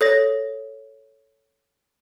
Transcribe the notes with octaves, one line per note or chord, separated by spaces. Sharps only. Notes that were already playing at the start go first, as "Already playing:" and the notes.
A4 C#5 A#6